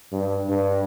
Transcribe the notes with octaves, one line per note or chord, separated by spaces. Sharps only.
G2
G2